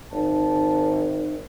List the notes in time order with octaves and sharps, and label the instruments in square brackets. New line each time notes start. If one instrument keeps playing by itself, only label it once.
[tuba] G#1 [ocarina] D#4 [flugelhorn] A5